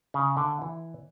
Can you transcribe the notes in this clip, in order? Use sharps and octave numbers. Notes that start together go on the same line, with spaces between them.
C#3
D3
E3